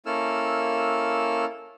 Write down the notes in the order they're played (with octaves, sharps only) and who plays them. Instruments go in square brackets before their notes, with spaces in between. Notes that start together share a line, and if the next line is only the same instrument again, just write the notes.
[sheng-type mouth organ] A#3 C#4 E4 A4 E6 F6